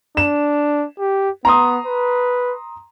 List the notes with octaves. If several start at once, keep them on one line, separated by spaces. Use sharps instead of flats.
D4 E7
G4
B3 A#5 C6 D#6
B4